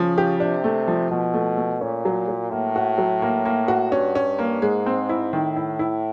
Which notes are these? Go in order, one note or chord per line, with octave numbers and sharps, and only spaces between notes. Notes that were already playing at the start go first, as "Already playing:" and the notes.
Already playing: C#3 F3
G4
C3 D4
A3
F3
B2 F3
A3
A3
A#2 C#4
F#3
F#3
A2 A#3
F#4
F#3
A#3
A#3
F#4
G2 C#4
C#4
A#3
G#2 G#3
C4
E4
A2 D#3
E4
E4